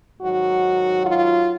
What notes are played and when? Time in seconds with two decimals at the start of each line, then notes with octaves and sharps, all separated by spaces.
0.20 G#2 D#3 F#3 F#4
1.07 F4